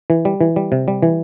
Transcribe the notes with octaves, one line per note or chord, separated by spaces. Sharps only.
E3
G3
E3
G3
C3
G3
E3